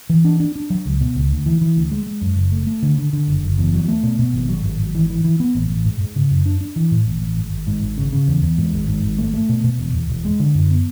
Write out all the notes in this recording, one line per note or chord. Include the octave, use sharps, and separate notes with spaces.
E3
D4
D4
D4
F#3
C#2
B2
C#2
D2
E3
E3
D2
G#3
G#3
F#2
F#1
A3
A3
D3
D3
D3
F#1
F#1
E2
F#3
A3
B2
B2
G#1
F#3
G#1
G#1
E3
E3
E3
B3
A1
A1
G#2
G#2
C#3
F#2
D4
D4
E3
A2
A1
A1
G#1
G#1
G#2
G#1
C#3
C#3
E2
E2
G#2
G#1
G#2
G#1
A3
A3
B2
B2
E1
E2
E1
G#3
D3
F#2
B3